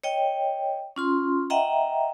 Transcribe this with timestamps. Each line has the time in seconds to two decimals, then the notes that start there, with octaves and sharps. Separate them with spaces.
0.04 C#5 D#5 G5
0.96 C#4 F4 C6
1.50 D#5 E5 F#5 G5 A#5